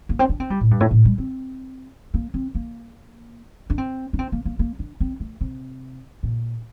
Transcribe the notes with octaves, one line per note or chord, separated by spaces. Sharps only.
A#3
C4
D4
C4
G3
A2
G2
A2
A2
G3
C4
A#3
C4
A#3
D4
C4
D4
C4
A#3
A#3
A#3
D4
C4
A3
C3
A#2